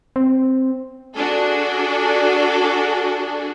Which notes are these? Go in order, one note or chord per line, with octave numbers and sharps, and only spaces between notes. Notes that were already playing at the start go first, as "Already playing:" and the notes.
C4
D4 F#4 G#4 A4